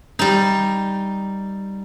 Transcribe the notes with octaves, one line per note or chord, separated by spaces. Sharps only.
G3 D#4